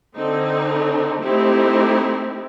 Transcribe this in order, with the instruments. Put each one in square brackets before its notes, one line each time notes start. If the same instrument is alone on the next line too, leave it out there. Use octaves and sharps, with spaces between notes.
[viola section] D3 C4 D#4
A3 C4 D#4 E4 G4